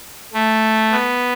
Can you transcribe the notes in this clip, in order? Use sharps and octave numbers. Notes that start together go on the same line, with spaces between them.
A3
B3